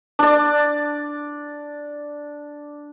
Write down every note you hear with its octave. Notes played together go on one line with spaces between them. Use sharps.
D4 D5